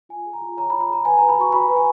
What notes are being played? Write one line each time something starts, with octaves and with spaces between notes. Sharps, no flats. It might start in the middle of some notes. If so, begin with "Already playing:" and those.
F4 G#5
G#4
A#5
F4
C#5 A#5
B5
F4
B5
G#4 A#5
B4 G#5
A#5
B4
B5
F#4 C#6
F#4 B5
B4
G#5